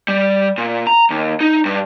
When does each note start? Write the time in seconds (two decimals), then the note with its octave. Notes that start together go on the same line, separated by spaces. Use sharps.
0.08 G3
0.58 A#2
0.87 A#5
1.10 D#2
1.41 D#4
1.66 G2